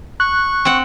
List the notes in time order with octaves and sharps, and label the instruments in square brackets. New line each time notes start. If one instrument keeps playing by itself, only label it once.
[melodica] C#6 [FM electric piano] F#6
[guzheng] C4 F#5